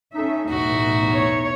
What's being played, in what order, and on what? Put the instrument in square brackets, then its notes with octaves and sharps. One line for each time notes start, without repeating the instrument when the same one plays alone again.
[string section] C#4 A4 E5 [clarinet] D#4
[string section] B1 E2 A2 [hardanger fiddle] F#4 E5
[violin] C#5